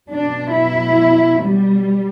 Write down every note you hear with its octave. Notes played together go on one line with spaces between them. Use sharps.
B2 F#3 D4
E4
G3